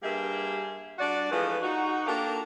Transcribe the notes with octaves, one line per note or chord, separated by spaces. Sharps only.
G2 G3 A#3 G#4 E5
G3 D4 F#4 D5
E3 F3 G#3 A3 B4
D#4 F#4
A#3 D4 F4 G4 A4 A#4